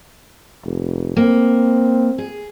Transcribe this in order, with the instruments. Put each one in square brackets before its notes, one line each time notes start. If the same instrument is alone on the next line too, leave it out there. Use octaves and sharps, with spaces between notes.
[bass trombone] F1
[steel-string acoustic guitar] A#3 [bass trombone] C4
[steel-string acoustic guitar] G#4